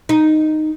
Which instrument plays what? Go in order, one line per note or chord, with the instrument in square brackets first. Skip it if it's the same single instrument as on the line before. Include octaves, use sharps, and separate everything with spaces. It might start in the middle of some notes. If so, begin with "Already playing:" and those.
[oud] D#4